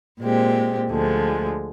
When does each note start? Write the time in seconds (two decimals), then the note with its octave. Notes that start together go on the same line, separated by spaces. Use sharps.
0.20 A#2 G#3 C4 G4
0.90 D2 D3 F3 G#3